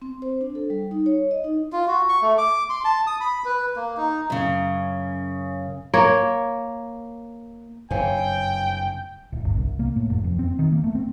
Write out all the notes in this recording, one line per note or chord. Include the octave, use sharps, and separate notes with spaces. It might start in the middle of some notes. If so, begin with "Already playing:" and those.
C4
C5
D4
A4
G3
D#4
C#5
D#5
D#4
F4
F#4
C#6
A3
D6
C6
A5
D#6
B5
B4
A#3
D#4
F#2 C#3
A#3 C#5
F#1 G2 C3 C#5 F5 G5 G#5
D1
G1
C2
A#3
A2
F1
F2
C4
D#3
A#3
A3
C4